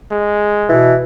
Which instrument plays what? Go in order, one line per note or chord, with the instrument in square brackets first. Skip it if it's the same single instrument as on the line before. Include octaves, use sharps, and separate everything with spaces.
[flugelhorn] G#3
[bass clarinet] B2 [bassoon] E3